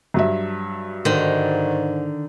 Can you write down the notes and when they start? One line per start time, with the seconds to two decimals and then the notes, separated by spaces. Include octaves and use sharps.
0.14 G2 F#3 E5
1.05 G#2 D3 D#3 C5